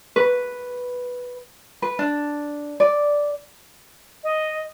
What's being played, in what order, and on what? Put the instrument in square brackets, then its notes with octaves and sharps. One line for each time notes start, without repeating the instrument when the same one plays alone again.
[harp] B4
[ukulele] B4
D4
D5
[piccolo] D#5